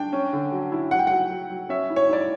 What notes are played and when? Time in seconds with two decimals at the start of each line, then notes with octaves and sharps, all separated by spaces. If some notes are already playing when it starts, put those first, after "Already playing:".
Already playing: D4 G5
0.13 C#4
0.33 D3
0.52 F#3
0.72 E4
0.91 F#3 F#5
0.99 G5
1.07 F#3 F#5
1.30 F#3
1.50 F#3
1.69 C#4 E5
1.90 E4
1.96 C#5
2.09 E4 D5